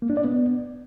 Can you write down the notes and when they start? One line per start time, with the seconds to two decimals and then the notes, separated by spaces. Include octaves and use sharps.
0.02 A#3
0.10 D4
0.17 D5
0.24 B3